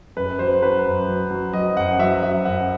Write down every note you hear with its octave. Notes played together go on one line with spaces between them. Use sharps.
F#2 B4
F#3 C5
F#3 B4
F#2
F#3
F#3
F#3 D#5
F#2 F#5
F#3 E5
F#3 E5
F#2 F#5